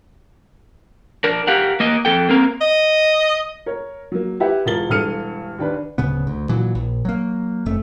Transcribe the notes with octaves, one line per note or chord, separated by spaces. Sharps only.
D4 A#4
G4 A#4 F5 F#5
A#3 A#4 D#5
F2 A4 G5
A#3 C4 A#4
D#5
A#4 C#5
F#3 A#3
E4 G4 B4 E5 F#5
E1 F4 A#4 A6 G7
E1 G2 A4 F6 C#7 D#7
D#2 D4 B4
D1 C#3 B3
D2
A#2 E3 F#3
A#1
F#3 A#3
F1 F2 A3